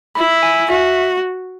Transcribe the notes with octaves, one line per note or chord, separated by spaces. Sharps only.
E4 B5
G#5
F#4 E5